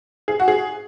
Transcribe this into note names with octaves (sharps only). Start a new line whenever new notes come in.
G#4
F#4
G#4